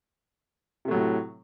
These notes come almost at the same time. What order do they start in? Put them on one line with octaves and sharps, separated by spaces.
C3 A3 F#3 A2